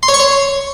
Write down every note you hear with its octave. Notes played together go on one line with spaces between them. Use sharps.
C6
C#5
C#6
C#5